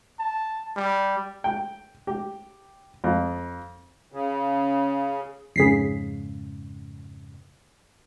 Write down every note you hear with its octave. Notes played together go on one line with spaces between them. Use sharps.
A5
G3
G5
G4
F2
C#3
F2 G#2 C#3 G#4 B6 C7